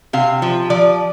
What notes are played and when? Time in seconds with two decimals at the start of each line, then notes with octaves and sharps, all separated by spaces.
0.13 C3 F5
0.42 F3
0.70 F3 D5